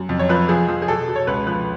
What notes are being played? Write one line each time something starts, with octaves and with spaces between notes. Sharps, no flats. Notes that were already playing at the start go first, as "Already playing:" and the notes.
Already playing: F#2
F2
C#5
F3 B4
F3 G#4
F3
G#4
B2 A4
B2
C#5
C#2 B4
F3 B4